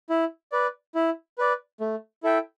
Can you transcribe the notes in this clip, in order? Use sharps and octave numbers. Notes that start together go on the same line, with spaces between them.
E4
B4 D5
E4
B4 D5
A3
E4 A4 E5 G5